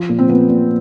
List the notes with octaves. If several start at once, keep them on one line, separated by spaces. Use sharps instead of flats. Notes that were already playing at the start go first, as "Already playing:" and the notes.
Already playing: F3 F4
A#2
C4
F3 B3
A#2